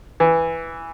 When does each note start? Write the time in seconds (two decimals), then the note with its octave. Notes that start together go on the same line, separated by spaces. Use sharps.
0.20 E3